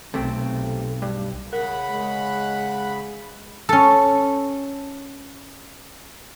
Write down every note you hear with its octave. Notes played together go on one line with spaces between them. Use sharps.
B1 C3 A3 C4
G2
C#3 A#4 F#5 B5
G#3
C#4 A4